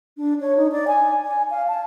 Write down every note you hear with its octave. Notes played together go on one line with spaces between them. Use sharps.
D4
C#5
D#4
D5
G#5
G#5
F5
A5